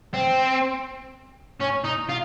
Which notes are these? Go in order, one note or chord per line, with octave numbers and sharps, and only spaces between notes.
C4
C#4
D#4
F4